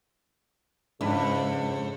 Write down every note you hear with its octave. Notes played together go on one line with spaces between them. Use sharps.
F2 G#2 C#3 G#3 D4 E4 B4